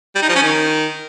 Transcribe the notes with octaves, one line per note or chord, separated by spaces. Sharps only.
G3
D#4
F3
C#4
D#3